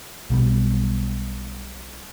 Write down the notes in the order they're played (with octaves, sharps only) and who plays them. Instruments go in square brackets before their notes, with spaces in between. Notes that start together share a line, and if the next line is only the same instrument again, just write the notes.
[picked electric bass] B1 B2 G3